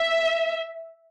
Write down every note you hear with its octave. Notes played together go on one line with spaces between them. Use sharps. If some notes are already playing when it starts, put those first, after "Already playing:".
Already playing: E5